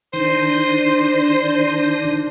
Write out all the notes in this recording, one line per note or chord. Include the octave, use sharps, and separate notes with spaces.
D#3 D4 D#4 C5